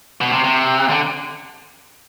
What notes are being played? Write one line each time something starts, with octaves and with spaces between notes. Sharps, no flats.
B2
C3
C3
D3